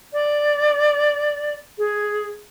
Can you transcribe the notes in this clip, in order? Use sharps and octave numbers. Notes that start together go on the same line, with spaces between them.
D5
G#4